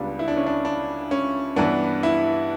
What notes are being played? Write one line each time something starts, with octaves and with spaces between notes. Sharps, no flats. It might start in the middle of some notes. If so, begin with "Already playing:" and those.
Already playing: C#2 C#3 G3 B3 D4
E4
D4
C#4
D4
D4
C#4
G2 E3 B3 D4
E4